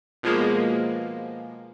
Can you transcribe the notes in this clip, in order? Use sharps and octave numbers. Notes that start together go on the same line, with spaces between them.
B2 F3 G#3 A#3